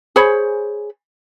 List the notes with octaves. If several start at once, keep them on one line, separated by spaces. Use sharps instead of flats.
G#4 C5 C#5 B5